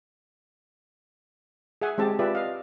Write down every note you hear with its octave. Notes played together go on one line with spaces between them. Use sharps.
G#4 E5 F#5 G#5
G#3 C4 G4 A5
F4 G4 B4 D5 E5
D#5 F5